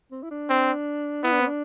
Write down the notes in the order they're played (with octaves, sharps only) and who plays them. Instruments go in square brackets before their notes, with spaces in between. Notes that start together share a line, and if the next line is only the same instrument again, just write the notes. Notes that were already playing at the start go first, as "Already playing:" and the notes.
[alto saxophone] C4
E4
D4
[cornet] C4
[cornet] B3 [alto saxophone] E4
[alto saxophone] D4
C4
D4